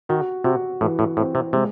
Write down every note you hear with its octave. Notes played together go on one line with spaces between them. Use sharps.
D#3 F#4
C3 F#4
A2 E3
A2
A2 C4
C3
C3 G#3